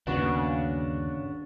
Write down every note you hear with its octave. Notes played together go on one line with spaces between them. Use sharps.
G1 D#2 C#3 A#3 B3 D4 F#4